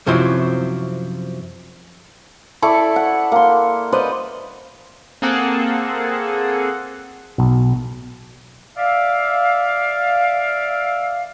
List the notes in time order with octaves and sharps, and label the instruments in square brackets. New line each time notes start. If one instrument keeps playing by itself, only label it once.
[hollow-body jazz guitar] F#2 C3 F3 F#3 C4 E4
[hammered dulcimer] E4 A4 D5 C#6
F#5
A#3 C6
B4 C5 D5 D#5
[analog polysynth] A#3 C4 G#4 A4 F#5
[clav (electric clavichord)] B1
[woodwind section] D5 E5 F5